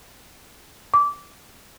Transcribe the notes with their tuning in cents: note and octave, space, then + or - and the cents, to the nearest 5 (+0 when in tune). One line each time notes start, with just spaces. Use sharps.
D6 -20